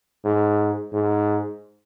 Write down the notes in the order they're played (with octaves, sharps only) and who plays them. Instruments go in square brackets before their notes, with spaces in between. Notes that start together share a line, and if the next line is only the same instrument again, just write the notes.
[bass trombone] G#2
G#2